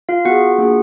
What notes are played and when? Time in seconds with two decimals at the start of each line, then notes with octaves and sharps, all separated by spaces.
0.09 F4 F5
0.25 B3 F4 F#4 G#4 F#5
0.58 A#3 D4 F4 G#4